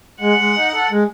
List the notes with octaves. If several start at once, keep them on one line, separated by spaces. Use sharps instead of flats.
G#3 F#5
G#3
D#4
A4
G#3